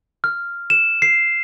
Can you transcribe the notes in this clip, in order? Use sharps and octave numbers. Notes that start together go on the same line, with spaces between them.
F6
E7
C7